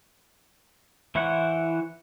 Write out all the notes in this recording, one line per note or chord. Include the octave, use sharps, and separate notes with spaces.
E3 E4 C5 C#5 F#5